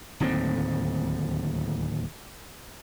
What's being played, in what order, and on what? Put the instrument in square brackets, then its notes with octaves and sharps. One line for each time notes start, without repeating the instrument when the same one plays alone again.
[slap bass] D1 D#2 A2 C4